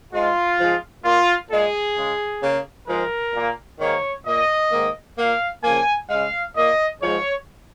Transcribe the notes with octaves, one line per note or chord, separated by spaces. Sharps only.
G#2 G#3 F4
G#2 F3 G#3
A#2 A#3 F4
A#2 G#3 G#4
C#3 G#3
C#3 A#3
G#2 F3 G#3 A#4
A#2 A#3
G#2 D#3 A#3 C#5
A#2 A#3 D#5
G#2 D#3 A#3
A#2 A#3 F5
C#3 F3 A#3 G#5
C#3 G#3 F5
A#2 A#3 D#5
G#2 F3 G#3 C#5